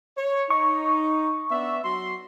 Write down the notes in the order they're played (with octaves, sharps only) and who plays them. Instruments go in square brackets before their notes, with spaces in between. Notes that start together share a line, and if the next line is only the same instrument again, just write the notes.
[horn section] C#5
[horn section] D#4 [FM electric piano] C#6
[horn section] B3 D4 E5
F#3 F#4 C6